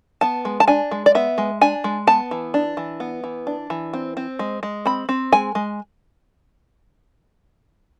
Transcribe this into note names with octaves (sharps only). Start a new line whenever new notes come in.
B3 A5
G#3
A5
D4 G#5
G#3
D5
B3 E5
G#3
D4 G#5
G#3
B3 A5
E3
D4
E3
B3
E3
D4
E3
C4
C4
G#3
G#3
C4 B5
C4
G#3 G#5
G#3